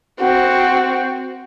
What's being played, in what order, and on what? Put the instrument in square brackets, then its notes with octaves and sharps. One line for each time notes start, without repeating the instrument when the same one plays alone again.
[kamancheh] C4 F#4